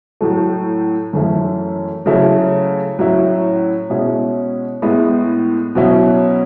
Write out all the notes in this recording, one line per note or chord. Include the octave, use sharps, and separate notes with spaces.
A2 F#3 A3
F#2 E3 A3 C#4 E4
C#3 F#3 A3 C#4 E4
A2 F#3 C#4 E4
B2 G#3 C#4 E4
A2 G#3 B3 E4
B2 F#3 C#4 E4